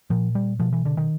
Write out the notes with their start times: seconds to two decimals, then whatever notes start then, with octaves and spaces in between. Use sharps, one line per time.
0.10 A#2 F3
0.35 G3
0.60 B2 F3
0.73 E3
0.85 D3
0.97 D#3